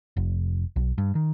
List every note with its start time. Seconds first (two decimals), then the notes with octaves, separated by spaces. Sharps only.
0.17 F1
0.76 B1
0.98 G2
1.15 D#3